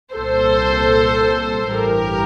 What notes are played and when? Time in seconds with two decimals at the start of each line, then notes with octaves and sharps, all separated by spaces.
0.14 C2 A#2 A4 C5
1.70 A1 G2 E3 G4 A#4